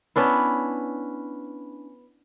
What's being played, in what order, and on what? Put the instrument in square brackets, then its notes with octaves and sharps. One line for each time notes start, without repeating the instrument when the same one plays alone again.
[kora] B3 C#4 D4 E4